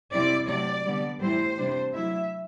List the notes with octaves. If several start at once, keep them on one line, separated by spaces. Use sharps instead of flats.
C3 G3 C4 E4 D5
C3 F#3 A3 D5
D3 G3 B3
A2 E3 G3 C4 E4 C5
C3 G3 D4
F#3 A3 E4 E5